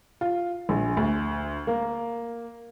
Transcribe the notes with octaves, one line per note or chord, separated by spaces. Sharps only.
F4
A#1
D2
A#3